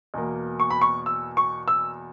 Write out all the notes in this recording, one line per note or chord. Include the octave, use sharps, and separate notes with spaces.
E2 B2 A#3
C#6
B5
C#6
E6
C#6
E6